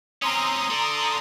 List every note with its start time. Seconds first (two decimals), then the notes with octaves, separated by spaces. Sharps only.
0.22 C4 C#4 A#5 C6 D#6
0.70 A4 D5